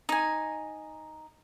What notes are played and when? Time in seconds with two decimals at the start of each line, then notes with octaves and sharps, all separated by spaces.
0.09 D#4 G#5